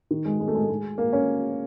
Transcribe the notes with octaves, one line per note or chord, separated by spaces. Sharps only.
D#3
G#3
G#3
A3
G#3
A3
G#3
A#3
C#4